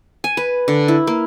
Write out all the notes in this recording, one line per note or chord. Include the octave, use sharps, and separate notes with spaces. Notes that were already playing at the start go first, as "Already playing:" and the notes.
G#5
B4
D3
E4
A#3